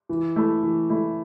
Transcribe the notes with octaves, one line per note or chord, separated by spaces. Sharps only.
E3
A3 E4
E3
A3 E4